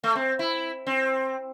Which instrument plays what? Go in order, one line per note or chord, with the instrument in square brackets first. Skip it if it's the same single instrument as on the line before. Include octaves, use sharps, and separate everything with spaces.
[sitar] A3
C4
E4
C4